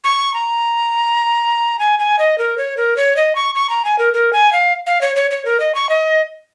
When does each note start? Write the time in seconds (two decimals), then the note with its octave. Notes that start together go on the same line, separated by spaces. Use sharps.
0.04 C#6
0.34 A#5
1.79 G#5
1.99 G#5
2.19 D#5
2.38 A#4
2.58 C#5
2.77 A#4
2.97 C#5
3.16 D#5
3.35 C#6
3.55 C#6
3.70 A#5
3.85 G#5
3.99 A#4
4.14 A#4
4.33 G#5
4.53 F5
4.87 F5
5.01 C#5
5.16 C#5
5.31 C#5
5.45 A#4
5.60 D#5
5.75 C#6
5.89 D#5